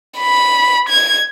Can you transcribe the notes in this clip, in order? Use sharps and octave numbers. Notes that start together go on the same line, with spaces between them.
B5
G#6